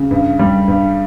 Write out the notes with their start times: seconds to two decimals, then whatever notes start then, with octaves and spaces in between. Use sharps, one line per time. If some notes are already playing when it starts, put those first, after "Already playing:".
Already playing: C#3
0.11 G2
0.39 G3
0.68 G2